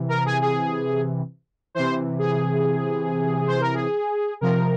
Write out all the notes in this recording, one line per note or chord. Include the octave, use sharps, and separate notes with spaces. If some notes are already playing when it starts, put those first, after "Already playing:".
Already playing: C3 E3
A#4
G#4
G#4
C3 E3 C5
G#4
C5
A#4
G#4
C3 F3 A#4